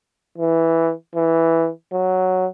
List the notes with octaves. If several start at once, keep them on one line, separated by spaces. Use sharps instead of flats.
E3
E3
F#3